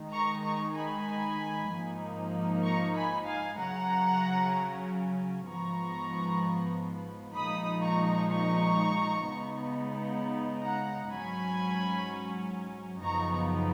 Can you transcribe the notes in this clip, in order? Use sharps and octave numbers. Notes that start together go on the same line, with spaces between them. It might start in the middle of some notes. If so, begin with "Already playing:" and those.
Already playing: D#3 G#3 D#4
A#5 C#6
A#5 C#6
G#5 B5
G#2 F3 A#3 D#4
A#5 C#6
G#5 B5
F5 G#5
C#3 F#3 C#4 F#5 A#5
G#2 F3 B3 A#5 C#6
A#2 F3 G#3 D#4 B5 D#6
A#5 C#6
A#5 C#6
C#3 G#3 B3 D#4
F#5 A#5
G#2 F#3 C#4 G#5 B5
F#2 C#3 F3 B3 D#4 A#5 C#6